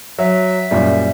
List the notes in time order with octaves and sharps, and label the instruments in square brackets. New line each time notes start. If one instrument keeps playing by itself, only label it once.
[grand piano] F#3 [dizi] E5
[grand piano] F#2 A#2 G3